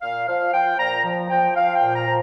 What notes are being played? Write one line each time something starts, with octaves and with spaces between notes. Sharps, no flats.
A#2 F5
F3 F5
F3 G5
A#2 A#5
F3
F3 G5
F3 F5
G5
A#2
A#5
F3